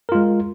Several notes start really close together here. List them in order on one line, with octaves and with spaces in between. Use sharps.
A#4 F4 G#3